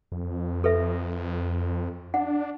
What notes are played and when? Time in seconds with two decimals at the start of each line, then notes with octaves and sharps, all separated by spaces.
0.12 F2
0.64 A4 B4 E5
2.14 D4 F#5